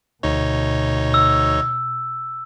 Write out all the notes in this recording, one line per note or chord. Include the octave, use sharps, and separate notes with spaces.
D2 B2 D#4 C#5
E6